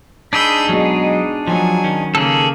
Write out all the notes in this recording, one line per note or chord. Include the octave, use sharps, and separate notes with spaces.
D4 D#4 G#4 B5 E6 G6
B2 F#3 G#3
F3 F#3 G#5
D#3 C#4
C#3 A#3 G#4 A4